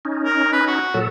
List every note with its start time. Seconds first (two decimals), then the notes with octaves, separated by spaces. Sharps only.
0.05 C#4 D#4
0.25 A#4
0.52 B4
0.67 F#4
0.94 A#2 F#3 A4